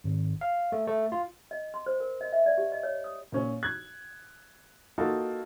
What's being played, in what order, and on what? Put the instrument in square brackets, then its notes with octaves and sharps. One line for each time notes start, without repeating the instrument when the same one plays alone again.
[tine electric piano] G#1
F5
A3
A3
F4
[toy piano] D#5
C6
C5
A#4
D#5
E5
D5
G4
D#5
C#5
D#6
[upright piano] A#2 C#4
F#6 G#6
A#3 D#4 F4 F#4 A4